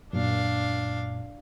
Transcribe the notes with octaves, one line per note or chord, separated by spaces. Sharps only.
F#2 A#2 D4 F5